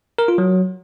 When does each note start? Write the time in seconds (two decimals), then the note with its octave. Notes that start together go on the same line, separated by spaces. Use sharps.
0.19 A#4
0.28 F4
0.38 F#3